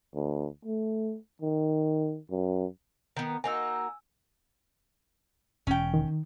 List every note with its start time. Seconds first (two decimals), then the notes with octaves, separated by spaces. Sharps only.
0.15 D2
0.65 A3
1.42 D#3
2.31 F#2
3.16 D#3 B3
3.44 A#3 D#4 F#4 G#5 E6
5.67 E1 C#4 G5
5.94 D#3